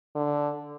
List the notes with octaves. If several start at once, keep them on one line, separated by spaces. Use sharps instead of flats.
D3